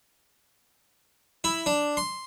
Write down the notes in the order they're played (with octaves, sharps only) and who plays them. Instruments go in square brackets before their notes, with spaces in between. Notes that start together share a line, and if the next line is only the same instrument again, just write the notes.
[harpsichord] E4
D4
C6